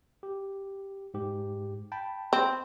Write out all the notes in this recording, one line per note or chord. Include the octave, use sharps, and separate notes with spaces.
G4
G#2 G4
G5 A5 B5
C4